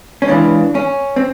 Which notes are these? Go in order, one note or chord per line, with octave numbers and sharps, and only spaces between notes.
C#4
C#2 C#3 E3 D4
C#4
C4